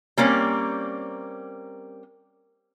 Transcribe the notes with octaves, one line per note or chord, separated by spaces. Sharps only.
G3 A#3 C4 C#4